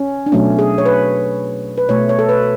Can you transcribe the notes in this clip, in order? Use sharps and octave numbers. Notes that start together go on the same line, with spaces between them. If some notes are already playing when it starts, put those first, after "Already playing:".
Already playing: C#4
D4
B2 F#3 A3 C#4
G#4
C#5
B4
B4
B2 A3 C#5
C#5
A4
B4